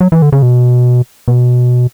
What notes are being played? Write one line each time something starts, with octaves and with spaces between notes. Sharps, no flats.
F#3
E3
D3
C#3
B2
B2